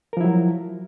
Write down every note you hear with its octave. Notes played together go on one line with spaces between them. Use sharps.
F3 F#3 E4 A#4